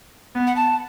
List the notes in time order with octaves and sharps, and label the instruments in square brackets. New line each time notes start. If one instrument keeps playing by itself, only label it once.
[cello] B3
[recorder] F#5
A5